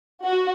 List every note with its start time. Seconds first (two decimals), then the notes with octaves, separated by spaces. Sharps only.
0.25 F#4